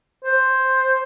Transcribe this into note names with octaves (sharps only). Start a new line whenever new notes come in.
C5